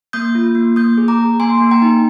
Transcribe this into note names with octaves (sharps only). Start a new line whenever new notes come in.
A#3 D#6 G6
F4
A#3
A#3 D#6 G6
G#4
A#5 D6
G#4
A#3 G#5 C6
A#3
G5 A#5
D#4